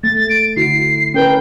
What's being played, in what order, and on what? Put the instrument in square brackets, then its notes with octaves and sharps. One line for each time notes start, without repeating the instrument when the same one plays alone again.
[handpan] A3 [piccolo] A6
[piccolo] A6
D7
[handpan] D3 E4 F#4 [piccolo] C7
[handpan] C#4 A#4 B4 [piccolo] G5